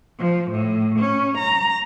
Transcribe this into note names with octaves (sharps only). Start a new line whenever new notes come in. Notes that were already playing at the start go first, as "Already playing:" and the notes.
F3
A2
C#4
A#5